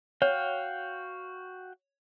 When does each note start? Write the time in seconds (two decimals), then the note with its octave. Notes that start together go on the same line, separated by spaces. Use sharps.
0.22 F#4 C#5 F5 G5